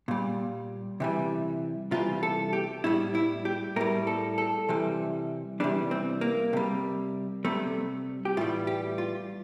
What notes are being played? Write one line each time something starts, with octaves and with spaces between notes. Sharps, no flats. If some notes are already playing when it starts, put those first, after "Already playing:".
A#2 G3
C3 E3 G3
C3 E3 G3 F4
A4
G4
A2 G3 E4
E4
G4
A2 G3 A#4
A4
A4
C3 E3 G3
C3 E3 G3 D4
C4
A#3
C3 G3
C3 G3 A3
G4
A2 E3 G3 F4
G4
F4